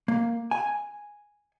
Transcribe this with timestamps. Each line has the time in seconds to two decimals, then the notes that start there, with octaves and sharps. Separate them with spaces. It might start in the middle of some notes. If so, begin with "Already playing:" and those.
0.08 A#3
0.51 G#5